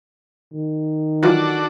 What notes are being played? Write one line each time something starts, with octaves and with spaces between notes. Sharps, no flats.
D#3
E3 F#3 D4 F4 F#4 A4